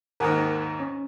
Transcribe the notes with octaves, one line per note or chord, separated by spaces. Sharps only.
D#2 G#2 D#3 A#4 F#5
C#4